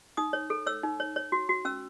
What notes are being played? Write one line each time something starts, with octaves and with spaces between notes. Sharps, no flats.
D#4 D#6
C#5
A4
C#5 E6
D#4
C#5
C#5
F#4
F#4
C#4 E6